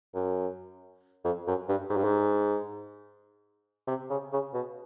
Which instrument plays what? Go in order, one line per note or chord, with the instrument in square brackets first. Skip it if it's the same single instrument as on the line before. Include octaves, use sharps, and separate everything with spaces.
[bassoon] F#2
F2
F#2
G2
G#2
G2
G#2
C3
C#3
C#3
B2